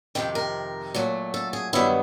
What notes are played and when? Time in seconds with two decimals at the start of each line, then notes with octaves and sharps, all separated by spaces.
0.15 F2 C3 D#3 G4
0.35 A#4
0.94 A#2 F#3 A3
1.34 A4
1.53 G#4
1.73 G2 D#3 F#3 B3 E4